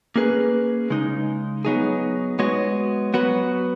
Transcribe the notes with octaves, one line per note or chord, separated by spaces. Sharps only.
A#3 C#4 G#4 B4
C#3 G#3 D#4
F#3 B3 D#4 G#4
G#3 B3 F#4 C#5
F#3 B3 F#4 B4